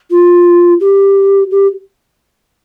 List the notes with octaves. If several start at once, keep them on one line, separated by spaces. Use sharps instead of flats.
F4
G4
G4